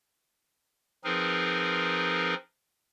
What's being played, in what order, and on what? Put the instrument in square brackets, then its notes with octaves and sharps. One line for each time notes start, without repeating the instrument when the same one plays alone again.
[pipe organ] F3 C4 D#4 G#4 A#4 B4